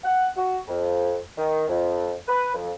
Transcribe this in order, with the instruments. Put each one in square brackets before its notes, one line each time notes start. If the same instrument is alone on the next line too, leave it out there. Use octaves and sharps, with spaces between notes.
[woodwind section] F#5
F#4
F2
D#3
F2
B4
F2